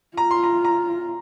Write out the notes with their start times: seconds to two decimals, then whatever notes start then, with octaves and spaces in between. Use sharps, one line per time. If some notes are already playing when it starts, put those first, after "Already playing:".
0.17 F4 A#5
0.31 C6
0.43 A#5
0.65 A#5